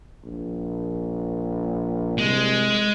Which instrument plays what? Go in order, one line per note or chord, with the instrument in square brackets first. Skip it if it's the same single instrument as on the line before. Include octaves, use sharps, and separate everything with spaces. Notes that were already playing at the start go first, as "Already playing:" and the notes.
[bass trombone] A#1
[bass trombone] C2 [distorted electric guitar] G#3